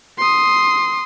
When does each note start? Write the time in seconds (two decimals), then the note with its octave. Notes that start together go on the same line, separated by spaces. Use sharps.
0.18 C6 D#6